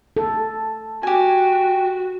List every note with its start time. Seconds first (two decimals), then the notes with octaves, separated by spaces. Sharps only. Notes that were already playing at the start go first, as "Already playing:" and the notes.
0.17 A4
1.03 F#4 G4 G#5